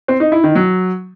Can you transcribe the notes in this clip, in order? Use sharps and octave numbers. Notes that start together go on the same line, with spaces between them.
C4
D#4
E4
D#3
F#3